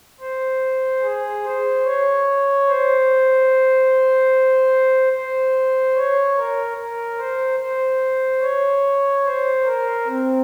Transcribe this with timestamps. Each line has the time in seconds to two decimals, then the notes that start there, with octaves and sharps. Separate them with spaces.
0.20 C5
1.02 G#4
1.44 C5
1.85 C#5
2.67 C5
5.13 C5
5.96 C#5
6.37 A#4
6.78 A#4
7.19 C5
7.59 C5
8.42 C#5
9.25 C5
9.65 A#4
10.07 C4